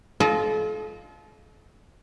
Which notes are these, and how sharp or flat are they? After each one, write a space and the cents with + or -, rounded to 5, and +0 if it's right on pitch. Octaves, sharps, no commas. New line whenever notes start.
F4 +0 A4 -40 D#5 +0